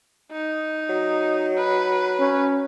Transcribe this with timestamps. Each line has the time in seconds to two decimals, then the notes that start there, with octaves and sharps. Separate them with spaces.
0.32 D#4
0.89 F#3
1.57 B4
2.20 C#4